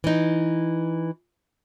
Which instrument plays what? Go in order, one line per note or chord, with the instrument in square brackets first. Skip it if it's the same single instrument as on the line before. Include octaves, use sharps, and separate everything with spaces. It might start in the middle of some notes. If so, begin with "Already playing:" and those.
[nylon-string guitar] E3 D#4